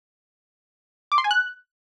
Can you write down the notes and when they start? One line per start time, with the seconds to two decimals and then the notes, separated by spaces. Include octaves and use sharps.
1.12 D6
1.18 C6
1.24 G#5
1.31 F#6